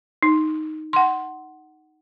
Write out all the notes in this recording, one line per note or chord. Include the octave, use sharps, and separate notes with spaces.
D#4
F#5 C6